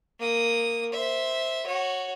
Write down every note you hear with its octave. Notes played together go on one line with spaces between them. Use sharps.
A#3 D#6
C5 E5
F#4 C#5